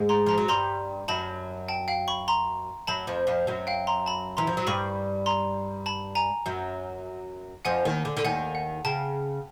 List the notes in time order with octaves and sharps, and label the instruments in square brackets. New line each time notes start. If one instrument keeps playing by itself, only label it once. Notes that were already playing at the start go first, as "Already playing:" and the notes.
Already playing: [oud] G#2 G#3
[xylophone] A#5 C6
[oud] F3 [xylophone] A#5 C6
[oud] F#3
[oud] G2 G3 [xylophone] A#5 C6
[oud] F#2 F#3 [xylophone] A5 B5
[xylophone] G5 A5
F5 G5
B5 C#6
A#5 C6
[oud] F#2 F#3 [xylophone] A5 B5
[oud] F2 F3
F2 F3
F#2 F#3
[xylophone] F5 G5
A#5 C6
A5 B5
[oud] E3 [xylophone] A#5 C6
[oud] F3
F#3
[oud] G2 G3 [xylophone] B5 C#6
[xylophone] A#5 C6
A5 B5
G#5 A#5
[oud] F#2 F#3
[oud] F2 F3 [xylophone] F#5 G#5
[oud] D#2 D#3
D3
D3
[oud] D#2 D#3 [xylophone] F#5 G#5
[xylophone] F#5
[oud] C#3 [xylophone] G5 A5